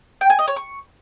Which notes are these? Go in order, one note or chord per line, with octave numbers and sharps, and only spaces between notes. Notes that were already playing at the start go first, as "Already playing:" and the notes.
G5
G#5
D#5
C#5
C#6